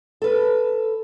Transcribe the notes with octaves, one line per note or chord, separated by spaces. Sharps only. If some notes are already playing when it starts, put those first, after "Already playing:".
A4 B4